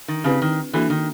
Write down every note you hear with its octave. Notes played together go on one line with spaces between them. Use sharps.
D#3
C#3 C4 E4 G4 B4 D5
D#3
E3 A#3 D4 F#4 A4
D#3